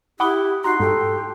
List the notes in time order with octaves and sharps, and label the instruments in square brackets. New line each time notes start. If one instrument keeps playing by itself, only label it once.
[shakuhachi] E4 [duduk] G4 [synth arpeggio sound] F#5 B5 D6 [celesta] D#6 F#6 G7
[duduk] D#4 [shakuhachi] F#4 [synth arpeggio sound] A#5 [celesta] C6 F#6 C7
[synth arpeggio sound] G#2 [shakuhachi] G4 [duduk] A4